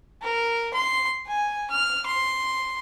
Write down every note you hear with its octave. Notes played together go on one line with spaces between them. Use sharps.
A#4
C6
G#5
F6
C6